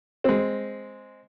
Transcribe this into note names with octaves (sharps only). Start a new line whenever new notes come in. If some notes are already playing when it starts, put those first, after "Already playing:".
G#3 C4